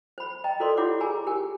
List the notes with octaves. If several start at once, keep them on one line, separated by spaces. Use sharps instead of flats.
C5 B5
D#5 G5 A#5
F#4 A4 A#4 C5 D5 C6
E4 F4 G4 C#5 F#5 D6
G#4 A#4 G#5 A#5
G4 A#4 G#5